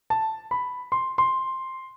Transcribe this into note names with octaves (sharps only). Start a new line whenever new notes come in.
A5
B5
C6
C6